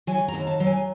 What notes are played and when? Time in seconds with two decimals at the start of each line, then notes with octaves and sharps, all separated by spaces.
0.07 F#3 G#5
0.28 A#5
0.34 D#2
0.47 A5
0.60 F#3
0.67 G#5